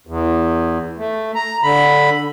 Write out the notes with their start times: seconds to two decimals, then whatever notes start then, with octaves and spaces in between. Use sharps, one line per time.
0.07 E2
0.98 A3
1.35 A#5
1.63 D3 B5